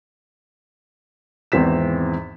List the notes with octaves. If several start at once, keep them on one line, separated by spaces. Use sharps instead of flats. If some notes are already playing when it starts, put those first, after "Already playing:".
G#1 E2 E3 C4 B6 E7